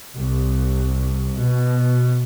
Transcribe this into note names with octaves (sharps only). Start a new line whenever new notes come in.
C2
B2